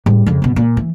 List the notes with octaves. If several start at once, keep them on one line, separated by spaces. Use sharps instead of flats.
A2 G3
F2 C#3
G2 B2
A#2
E3